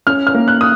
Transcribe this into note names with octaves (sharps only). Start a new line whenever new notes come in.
C#4 F6
F6
A#3
F#6
D#6